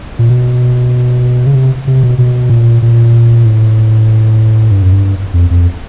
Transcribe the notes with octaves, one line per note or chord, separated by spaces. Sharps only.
A#2
B2
C#3
C3
C3
B2
B2
A#2
A#2
A2
G2
F#2
G2
F2
F2